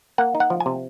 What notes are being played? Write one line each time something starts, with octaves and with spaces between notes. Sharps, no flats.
A#3 F#5
D#4
F#5
F3
G#5
C3